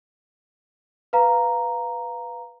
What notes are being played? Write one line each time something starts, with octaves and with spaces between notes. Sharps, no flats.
B4 F5 A#5